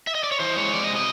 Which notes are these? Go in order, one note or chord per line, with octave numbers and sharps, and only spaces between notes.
E5
D#5
D5
C#5
E3 C5
G#3 C#5
F2 D5
D#5
C3
D#5